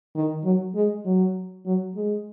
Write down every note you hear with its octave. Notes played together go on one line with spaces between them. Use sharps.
D#3
F#3
G#3
F#3
F#3
G#3